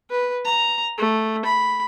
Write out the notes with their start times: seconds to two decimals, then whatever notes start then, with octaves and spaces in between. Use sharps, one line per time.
0.10 B4
0.45 A#5
0.98 A3
1.45 B5